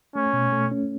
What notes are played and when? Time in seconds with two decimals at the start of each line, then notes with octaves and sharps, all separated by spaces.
0.16 A3 C#4
0.33 B2
0.52 A3
0.71 C#4